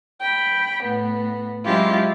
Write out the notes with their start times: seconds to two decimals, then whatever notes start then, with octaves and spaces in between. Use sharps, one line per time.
0.21 G5 B5
0.83 A2 B3
1.65 F#3 G#3 C#4 E4 F4 G4